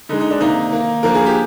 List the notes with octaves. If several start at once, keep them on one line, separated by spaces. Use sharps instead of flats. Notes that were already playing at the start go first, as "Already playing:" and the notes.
D3 G#3 D#4
D#4
D4
C3 D#3 A#3 D#4
D#3 A#3
D3 F3 A#3 A#4
G#4
G4